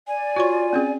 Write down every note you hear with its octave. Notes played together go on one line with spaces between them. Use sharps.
D5 G#5
F4 F#4 C#5 C#6
C4 C#4 G#4